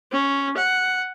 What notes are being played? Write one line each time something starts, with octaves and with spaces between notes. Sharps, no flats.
C#4
F#5